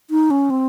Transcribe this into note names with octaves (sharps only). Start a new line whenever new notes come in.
D#4
C#4
C4